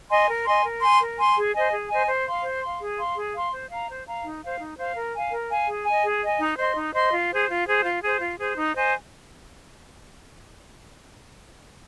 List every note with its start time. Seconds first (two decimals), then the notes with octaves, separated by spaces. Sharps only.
0.09 D#5 G#5 C6
0.27 A#4
0.45 D#5 G#5 C6
0.63 A#4
0.81 G#5 C6
0.99 A#4
1.18 G#5 C6
1.35 G#4
1.53 C5 D#5 G#5
1.72 G#4
1.89 C5 D#5 G#5
2.07 C5
2.25 F5 C6
2.43 C5
2.61 F5 C6
2.80 G#4
2.97 F5 C6
3.16 G#4
3.33 F5 C6
3.52 C5
3.70 F5 A#5
3.88 C5
4.06 F5 A#5
4.24 D#4
4.42 C5 F5
4.60 D#4
4.78 C5 F5
4.95 A#4
5.14 F5 G#5
5.32 A#4
5.49 F5 G#5
5.67 G#4
5.86 D#5 G#5
6.04 G#4
6.22 D#5 G#5
6.40 D#4
6.58 C5 D#5 C6
6.76 D#4
6.94 C5 D#5 C6
7.12 F4
7.30 G#4 C5
7.48 F4
7.66 G#4 C5
7.84 F4
8.02 G#4 C5
8.20 F4
8.38 G#4 C5
8.56 D#4
8.74 C5 D#5 G#5